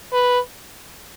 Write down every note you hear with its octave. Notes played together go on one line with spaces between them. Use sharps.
B4